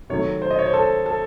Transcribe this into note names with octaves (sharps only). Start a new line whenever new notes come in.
C3 D#3 F#3 A3 C#5
C5
D#5
C#5
C5
A4
A4